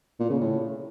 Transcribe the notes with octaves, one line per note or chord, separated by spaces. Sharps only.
A#2
C#3
A2